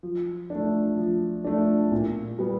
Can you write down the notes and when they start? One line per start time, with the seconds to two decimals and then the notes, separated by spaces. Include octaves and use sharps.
0.03 F3
0.50 A3 D4
0.98 F3
1.45 A3 D4
1.92 A#2
2.39 G3 B3